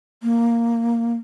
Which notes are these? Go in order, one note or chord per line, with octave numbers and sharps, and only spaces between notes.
A#3